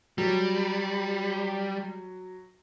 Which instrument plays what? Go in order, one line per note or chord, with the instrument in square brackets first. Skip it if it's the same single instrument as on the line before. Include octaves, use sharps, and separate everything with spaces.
[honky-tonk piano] F#3 [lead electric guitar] G3